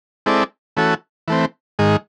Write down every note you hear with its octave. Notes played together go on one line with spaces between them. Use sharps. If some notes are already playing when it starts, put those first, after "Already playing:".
G#3 C4 E4 A4 D5
E3 A3 C#4 F#4 A4
E3 A3 C4
G#2 D#3 G#3